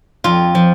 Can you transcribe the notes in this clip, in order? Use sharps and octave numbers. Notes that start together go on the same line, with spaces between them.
F2 F4
F3